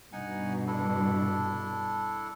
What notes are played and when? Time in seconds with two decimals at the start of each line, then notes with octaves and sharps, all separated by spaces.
0.13 G2 B2 D#4 F#5 G#5
0.67 D4 E4 A4